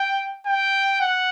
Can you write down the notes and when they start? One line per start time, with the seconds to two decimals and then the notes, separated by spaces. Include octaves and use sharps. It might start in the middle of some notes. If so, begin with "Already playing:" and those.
Already playing: G5
0.47 G5
1.01 F#5